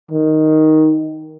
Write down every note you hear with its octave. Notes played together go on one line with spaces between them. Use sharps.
D#3